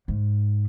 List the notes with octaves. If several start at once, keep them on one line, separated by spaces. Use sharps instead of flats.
G#2